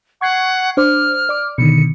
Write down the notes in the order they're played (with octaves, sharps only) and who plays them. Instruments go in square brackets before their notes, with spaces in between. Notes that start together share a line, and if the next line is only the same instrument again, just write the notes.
[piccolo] F#5 [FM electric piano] C#6 G#6 C7
[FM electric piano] D4 C5 D6 [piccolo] F6
[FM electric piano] D5 D6
[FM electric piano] B2 D3 D#3 [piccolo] C#7